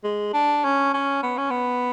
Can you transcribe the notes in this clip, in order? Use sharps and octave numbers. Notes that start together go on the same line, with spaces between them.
G#3
D4
C#4
C#4
B3
C#4
B3